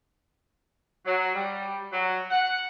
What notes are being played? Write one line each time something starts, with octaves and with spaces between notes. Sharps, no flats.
F#3
G3
F#3
F#5